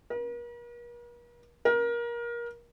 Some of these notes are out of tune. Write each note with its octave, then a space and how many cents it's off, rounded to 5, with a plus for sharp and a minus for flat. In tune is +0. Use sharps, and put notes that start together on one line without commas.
A#4 +45
A#4 +25